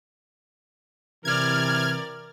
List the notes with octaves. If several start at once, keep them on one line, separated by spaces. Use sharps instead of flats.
C3 E3 A#4 D5 F6 G#6